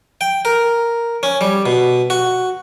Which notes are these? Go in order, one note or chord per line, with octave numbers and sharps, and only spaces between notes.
G5
A#4
C#4
G3
B2
F#4